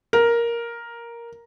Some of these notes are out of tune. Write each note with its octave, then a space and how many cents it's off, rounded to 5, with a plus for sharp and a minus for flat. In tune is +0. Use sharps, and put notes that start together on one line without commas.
A#4 +5